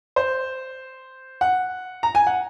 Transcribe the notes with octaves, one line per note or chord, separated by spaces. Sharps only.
C5
F#5
A#5
G#5
F#5